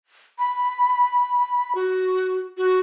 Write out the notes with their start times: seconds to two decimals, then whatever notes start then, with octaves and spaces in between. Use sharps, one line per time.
0.39 B5
1.75 F#4
2.57 F#4